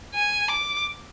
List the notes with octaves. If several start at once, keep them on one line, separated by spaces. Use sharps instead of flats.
G#5
D6